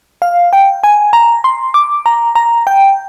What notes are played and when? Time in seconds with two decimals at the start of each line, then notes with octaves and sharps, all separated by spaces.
0.22 F5
0.53 G5
0.83 G#5
1.13 A#5
1.44 C6
1.74 D6
2.06 A#5
2.35 A#5
2.67 G5